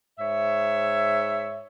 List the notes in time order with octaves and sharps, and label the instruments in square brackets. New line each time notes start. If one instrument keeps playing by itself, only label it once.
[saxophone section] G#2 C#5 E5